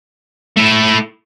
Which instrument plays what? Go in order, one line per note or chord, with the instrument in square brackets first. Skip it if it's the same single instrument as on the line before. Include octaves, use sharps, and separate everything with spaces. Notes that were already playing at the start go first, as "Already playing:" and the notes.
[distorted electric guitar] A3 E4